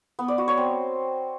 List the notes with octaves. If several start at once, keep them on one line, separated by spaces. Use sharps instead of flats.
B3
D5
F#4
C#5
C4